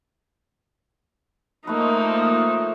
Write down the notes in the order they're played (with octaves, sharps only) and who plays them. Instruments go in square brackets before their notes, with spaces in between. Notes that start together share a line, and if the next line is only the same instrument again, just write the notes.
[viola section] F3 A#3 C5 [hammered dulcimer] A3 B4 [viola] D#4